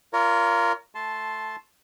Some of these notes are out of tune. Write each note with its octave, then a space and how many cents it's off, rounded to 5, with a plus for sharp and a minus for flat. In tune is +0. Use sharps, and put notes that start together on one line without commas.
F4 -20 A#4 +0 C#5 +35
A3 +0 A5 -10 C6 +0